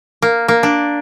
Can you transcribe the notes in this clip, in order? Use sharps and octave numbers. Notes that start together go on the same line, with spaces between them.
A#3
A#3
D4